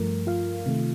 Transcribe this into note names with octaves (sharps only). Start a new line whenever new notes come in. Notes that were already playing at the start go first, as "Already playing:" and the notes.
Already playing: G2 F3 A3 A#4
F4 F5
C3 D#3 A3